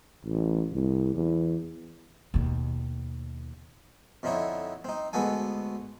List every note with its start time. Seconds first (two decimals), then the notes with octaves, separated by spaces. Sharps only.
0.24 A1
0.72 C2
1.15 E2
2.34 D#2 B2
4.23 F2 D3 C4 D#4 E4 C#5
4.84 C4 D#4
5.13 D2 G#3 B3 F#4 A4 G#5